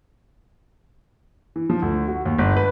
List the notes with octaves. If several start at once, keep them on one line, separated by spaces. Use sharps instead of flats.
E3
F3
D2
F#4
D#2
G1
B4